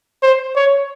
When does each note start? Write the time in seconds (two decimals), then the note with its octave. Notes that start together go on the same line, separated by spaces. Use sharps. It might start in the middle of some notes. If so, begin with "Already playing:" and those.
0.23 C5
0.56 C#5